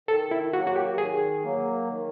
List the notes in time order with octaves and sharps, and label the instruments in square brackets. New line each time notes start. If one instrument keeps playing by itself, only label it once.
[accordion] D#3 [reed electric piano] A4
[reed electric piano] E4
[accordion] F#3 A#3 [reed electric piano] F#4
[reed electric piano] F#4
G4
[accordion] D#3 [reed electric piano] G#4
[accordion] F#3 A#3
D#3